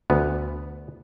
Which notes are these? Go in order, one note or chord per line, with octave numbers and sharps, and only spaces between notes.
D2 B3